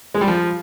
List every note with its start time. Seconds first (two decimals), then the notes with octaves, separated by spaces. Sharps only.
0.15 G#3
0.21 G3
0.28 F3